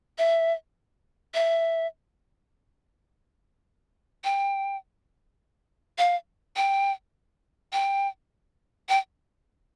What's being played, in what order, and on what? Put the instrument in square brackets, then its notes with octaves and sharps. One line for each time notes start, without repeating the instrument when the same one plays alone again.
[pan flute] E5
E5
G5
F5
G5
G5
G5